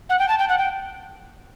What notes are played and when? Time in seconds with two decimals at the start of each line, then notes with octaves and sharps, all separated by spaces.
0.09 F#5
0.19 G5
0.28 A5
0.39 G5
0.49 F#5
0.58 G5